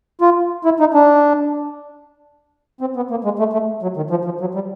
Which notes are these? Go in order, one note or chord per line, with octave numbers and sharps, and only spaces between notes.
F4
E4
D#4
D4
C4
B3
A#3
G#3
A3
A3
F#3
D#3
F3
F3
F#3
G3